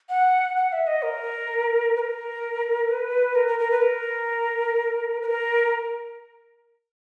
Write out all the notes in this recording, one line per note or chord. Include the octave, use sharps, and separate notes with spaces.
F#5
F#5
E5
D#5
A#4
B4
A#4
B4
A#4
A#4
A#4
B4
A#4
B4
A#4